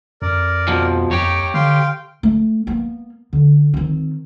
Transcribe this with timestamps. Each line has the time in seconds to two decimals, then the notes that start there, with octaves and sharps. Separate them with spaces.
0.22 F2 A#4 D5
0.68 B2 F3
1.11 F2 G4 C#5 G5 A#5
1.54 D3 F5 G5 C6
2.23 A3
2.67 A#3 B3
3.33 D3
3.74 D#3 C4